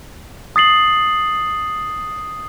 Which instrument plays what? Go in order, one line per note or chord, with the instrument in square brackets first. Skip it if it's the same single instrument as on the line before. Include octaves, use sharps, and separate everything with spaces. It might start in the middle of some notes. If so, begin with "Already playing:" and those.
[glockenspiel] D#6 A6 C7 F#7